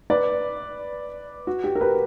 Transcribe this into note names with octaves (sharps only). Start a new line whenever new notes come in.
B4 D5
F#4
G4
A#4
G4 B4